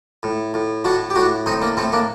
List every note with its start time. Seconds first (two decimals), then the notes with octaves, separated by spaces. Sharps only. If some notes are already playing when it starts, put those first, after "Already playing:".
0.23 A2
0.54 A2
0.84 A2 D4 F#4
1.10 G4
1.15 A2 D4 F#4
1.46 A2 C4 D#4
1.61 A#3 D4
1.77 A2 A3 C4
1.92 A#3 D4